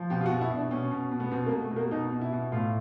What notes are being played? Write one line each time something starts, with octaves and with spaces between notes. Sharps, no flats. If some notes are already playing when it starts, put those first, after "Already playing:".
Already playing: F3
B2 G4
F4
F#4
B2
E4
B2
D4
B2 C#4
B2
B2
B3
B2 C4
A#3
B2
A3
B2
A#3
B2 D#4
B2
E4
B2
A2 F4